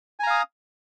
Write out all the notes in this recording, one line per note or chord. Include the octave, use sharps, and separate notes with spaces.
F5 G#5 A#5 D#6